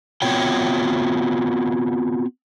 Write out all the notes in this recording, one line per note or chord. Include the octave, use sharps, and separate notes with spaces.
B3 C4 F4 F#4 C#5 G5